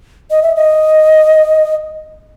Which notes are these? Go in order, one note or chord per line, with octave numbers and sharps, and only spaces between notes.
D#5
E5
D#5